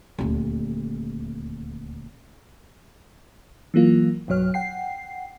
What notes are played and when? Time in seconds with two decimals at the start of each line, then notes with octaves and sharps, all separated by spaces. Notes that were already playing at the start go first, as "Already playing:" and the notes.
0.18 D#1 D2
3.74 E3 F#3 A#3 F4
4.28 B1 G2 F#3 C#5 F6
4.54 F#5 G5 C7